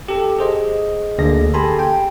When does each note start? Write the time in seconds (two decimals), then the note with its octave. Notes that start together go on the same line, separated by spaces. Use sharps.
0.08 G4 A4
0.39 G#4 C5 D#5
1.18 D2 D3 A#3 G#4 A#6
1.54 G4 A4 G#5 A5 B5 C6
1.79 G5